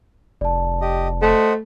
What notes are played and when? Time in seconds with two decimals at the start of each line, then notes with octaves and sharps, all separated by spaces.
0.41 F1 D5 A5
0.81 G4 D#5
1.22 A3 C5 D#5 F#5